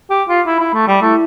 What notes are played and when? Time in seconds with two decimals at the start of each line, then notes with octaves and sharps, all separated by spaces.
0.10 G4
0.29 F4
0.46 E4
0.60 E4
0.74 A3
0.88 G3
1.02 A3 E4